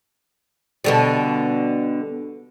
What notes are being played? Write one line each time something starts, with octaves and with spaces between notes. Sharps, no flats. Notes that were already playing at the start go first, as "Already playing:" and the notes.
B2 D3 G3